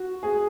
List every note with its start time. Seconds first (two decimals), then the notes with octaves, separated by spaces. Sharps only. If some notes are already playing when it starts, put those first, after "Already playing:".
Already playing: F#4
0.23 G#4